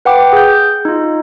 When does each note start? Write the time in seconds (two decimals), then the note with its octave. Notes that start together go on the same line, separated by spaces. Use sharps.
0.05 B4 F#5 G5 D6
0.33 G#4 G6
0.85 D#4 F4